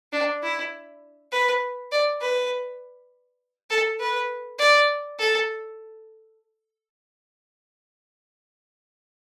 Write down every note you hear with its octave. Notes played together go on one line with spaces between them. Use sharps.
D4
E4
B4
D5
B4
A4
B4
D5
A4